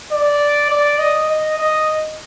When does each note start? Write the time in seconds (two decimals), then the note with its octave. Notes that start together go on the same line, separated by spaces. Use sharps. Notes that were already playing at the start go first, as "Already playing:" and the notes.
0.12 D5
0.70 D5
0.99 D#5
1.29 D#5
1.58 D#5